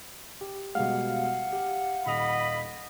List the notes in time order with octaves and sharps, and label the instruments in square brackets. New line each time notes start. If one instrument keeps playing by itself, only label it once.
[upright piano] G4
[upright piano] B2 G3 G#3 [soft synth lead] F5 [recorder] F#5
[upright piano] G4
[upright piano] D#1 F7 [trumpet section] D#5 B5